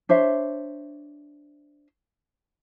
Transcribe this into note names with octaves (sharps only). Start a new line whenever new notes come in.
D4 C5 C#5 E5